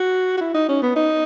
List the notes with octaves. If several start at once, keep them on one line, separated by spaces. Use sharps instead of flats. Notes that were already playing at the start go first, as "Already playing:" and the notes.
Already playing: F#4
F#4
E4
D#4
C#4
B3
D#4